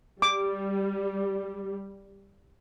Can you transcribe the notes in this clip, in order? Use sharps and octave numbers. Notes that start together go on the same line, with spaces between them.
G3 D6